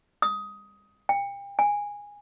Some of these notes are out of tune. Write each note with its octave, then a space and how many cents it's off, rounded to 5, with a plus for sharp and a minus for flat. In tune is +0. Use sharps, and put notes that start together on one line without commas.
D#6 +15
G5 +35
G#5 -15